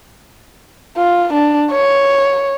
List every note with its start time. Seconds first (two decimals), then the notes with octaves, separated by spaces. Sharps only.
0.97 F4
1.33 D4
1.72 C#5